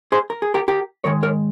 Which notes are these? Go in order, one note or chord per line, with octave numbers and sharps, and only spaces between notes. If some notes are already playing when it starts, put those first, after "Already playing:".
G#4 C5
A#4
G#4
G4 A#4
G4 A#4
G#2 D#3 G#3 A#4 C#5
A#4 C#5